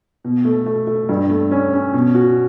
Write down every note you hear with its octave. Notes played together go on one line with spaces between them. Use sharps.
B2
A3
A3
A3
G2
A3
C#4
C#4
B2
F#4